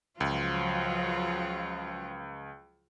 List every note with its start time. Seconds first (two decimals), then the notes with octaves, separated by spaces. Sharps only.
0.20 C#2 F3 F#3 F4